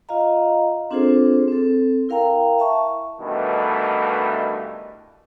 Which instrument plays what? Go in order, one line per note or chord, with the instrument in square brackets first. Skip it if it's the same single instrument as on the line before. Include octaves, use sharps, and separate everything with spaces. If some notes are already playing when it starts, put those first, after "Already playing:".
[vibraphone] F4 D#5 F5 A#5
C4 D4 F4 G#4 A4 C5
C4 A4
E4 A#4 F5 G5 A#5
E5 A5 C#6
[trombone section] G2 B2 D#3 E3 A3